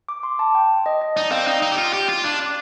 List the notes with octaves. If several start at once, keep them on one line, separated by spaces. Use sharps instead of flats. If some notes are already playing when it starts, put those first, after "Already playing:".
D6
C6
A5
G5
D#5
D#5
D#4 D5
C4 F5
D#4 G5
D#4
G4
F4
G4
F4
D4
D6